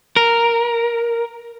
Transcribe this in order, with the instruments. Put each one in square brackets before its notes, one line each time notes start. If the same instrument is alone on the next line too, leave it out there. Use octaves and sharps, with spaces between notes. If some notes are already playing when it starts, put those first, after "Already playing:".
[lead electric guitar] A#4